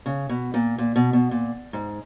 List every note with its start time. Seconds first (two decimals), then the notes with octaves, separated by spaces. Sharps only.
0.06 C#3
0.29 B2
0.54 A#2
0.78 A#2
0.96 B2
1.13 B2
1.31 A#2
1.73 G#2